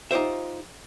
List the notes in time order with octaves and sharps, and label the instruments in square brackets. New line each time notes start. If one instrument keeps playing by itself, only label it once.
[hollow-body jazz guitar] D#4 F4 G4 C5 E5